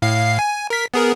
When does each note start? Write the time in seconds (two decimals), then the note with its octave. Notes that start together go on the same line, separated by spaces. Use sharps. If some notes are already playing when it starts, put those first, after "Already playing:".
0.02 A2 F5 C7
0.39 G#5
0.70 A#4 B6
0.94 B3 G#4 A#4